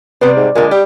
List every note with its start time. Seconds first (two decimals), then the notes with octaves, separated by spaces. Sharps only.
0.21 C3 G3 B3
0.37 G#2
0.55 A#2 D3 G#3
0.71 G3 G4